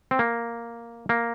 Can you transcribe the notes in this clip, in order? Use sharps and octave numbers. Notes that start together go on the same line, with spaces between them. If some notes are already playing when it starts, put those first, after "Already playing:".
C4
A#3
A#3